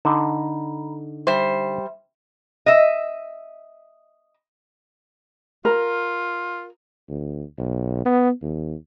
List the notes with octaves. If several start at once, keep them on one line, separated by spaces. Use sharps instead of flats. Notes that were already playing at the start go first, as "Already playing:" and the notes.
D3 D#4 A#5 B5
G3 C5 E5
D#5 E5
F4 A#4
D2
B1
B3
D#2